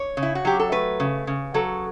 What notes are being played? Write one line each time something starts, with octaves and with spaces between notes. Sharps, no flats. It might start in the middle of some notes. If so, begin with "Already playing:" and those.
Already playing: C#5
C#3
E4
F#4
F#3 G4
A4
A3 B4
C#3
C#3
F#3 A4